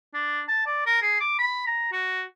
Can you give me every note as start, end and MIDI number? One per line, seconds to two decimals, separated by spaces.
0.14 0.41 62
0.48 0.66 81
0.66 0.82 74
0.86 1.02 70
1.02 1.18 68
1.20 1.35 86
1.39 1.62 83
1.67 1.90 82
1.92 2.23 66